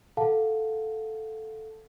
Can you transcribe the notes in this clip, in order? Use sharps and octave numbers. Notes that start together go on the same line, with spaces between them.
A4 F5 F#5 A5